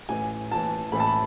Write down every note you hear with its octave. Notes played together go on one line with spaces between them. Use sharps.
A1 A2 E3 G#5
A1 A2 E3 A5
A1 A2 E3 B5
A5
B5